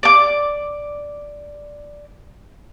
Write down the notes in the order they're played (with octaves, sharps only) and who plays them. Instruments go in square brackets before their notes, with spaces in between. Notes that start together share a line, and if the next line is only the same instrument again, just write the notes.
[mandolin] D5 D6